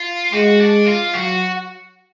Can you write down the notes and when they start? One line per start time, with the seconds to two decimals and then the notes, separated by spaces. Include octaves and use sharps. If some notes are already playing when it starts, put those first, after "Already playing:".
Already playing: F4
0.33 G#3 F#4
0.60 D4
0.86 F4
1.13 F#3 F#4